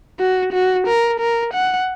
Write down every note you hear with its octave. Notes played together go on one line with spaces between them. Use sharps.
F#4
F#4
A#4
A#4
F#5